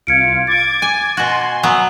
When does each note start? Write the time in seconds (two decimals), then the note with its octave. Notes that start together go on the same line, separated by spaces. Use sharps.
0.07 C2 F4 F5 G#6 C#7 D7
0.47 D6 G#6 A6 D7
0.82 G#5
1.17 B2 F#4 G#5 C6
1.63 F#3 B3